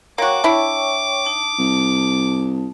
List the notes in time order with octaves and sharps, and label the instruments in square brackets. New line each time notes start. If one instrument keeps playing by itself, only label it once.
[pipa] A#3 F#4 [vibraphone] C#5 G5 C#6 [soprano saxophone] D6
[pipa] D4 E4
[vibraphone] D#4 A5
[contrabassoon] C2